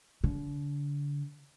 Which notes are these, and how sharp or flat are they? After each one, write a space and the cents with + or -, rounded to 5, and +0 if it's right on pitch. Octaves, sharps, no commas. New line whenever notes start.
D3 -35